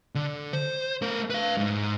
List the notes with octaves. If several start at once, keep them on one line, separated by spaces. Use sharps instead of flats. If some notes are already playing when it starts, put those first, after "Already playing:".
D3
C5
A3 A#4
B4 F5
G#2